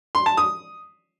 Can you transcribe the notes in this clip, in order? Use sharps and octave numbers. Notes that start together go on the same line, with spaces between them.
C6
A5
D#6